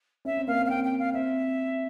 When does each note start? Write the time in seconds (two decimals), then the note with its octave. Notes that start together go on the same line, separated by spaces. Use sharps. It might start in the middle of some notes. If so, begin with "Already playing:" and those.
0.25 C#4 E5
0.37 C4
0.47 A#3 F5
0.59 C4
0.65 F5
0.69 C4 G5
0.84 G5
0.99 F5
1.13 C4 E5